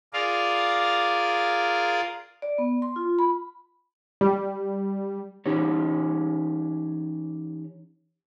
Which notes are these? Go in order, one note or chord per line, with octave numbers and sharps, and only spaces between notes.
F4 G#4 A#4 D5 F5
D5
B3
C6
F4
B5
G3
E3 C#4 D#4 G4 C#5